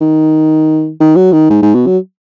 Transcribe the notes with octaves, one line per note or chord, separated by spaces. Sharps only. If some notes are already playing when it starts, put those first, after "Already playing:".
D#3
D#3
F#3
D#3
G#2
G#2
B2
F#3